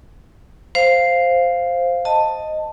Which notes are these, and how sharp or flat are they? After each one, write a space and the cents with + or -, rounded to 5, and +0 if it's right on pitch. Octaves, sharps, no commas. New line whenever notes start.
C5 +0 F5 +0
D#5 +0 A5 +10